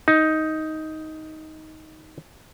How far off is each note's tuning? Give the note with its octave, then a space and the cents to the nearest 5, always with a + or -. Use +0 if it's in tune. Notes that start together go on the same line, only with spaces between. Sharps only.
D#4 +10